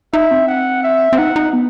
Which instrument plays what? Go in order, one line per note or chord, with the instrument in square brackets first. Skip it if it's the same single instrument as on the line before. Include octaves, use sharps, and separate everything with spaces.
[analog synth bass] D#4 [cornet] E5
[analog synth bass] C4
[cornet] F#5
E5
[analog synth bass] C4
[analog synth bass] D#4 [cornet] F#5
[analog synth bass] D#4
B3